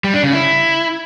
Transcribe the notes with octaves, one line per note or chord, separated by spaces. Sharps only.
G3
D4
C#3
E4